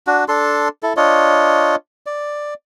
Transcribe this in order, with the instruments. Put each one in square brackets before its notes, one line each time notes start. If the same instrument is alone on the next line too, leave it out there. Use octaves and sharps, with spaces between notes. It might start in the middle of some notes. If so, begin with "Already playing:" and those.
[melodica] D4 F#4
D4 A4 C6
E4 A4
D4 F4 C#5 D#5
D5